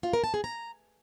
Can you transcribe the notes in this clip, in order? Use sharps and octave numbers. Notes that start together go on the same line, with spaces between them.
F4
A#4
A5
G#4
A#5